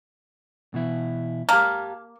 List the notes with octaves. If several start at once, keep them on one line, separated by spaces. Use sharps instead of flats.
B2 E3 E4
A#3 G4 F5 A5